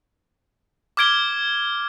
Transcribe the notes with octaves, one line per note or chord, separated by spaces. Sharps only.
D6 F6 G#6 D7 G7